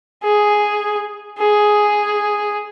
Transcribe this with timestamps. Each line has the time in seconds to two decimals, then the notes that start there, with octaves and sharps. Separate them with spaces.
0.23 G#4
1.39 G#4